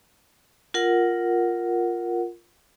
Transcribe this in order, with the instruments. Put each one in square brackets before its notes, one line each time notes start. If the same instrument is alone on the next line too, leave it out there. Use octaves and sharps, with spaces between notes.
[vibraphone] F4 A#4 F#5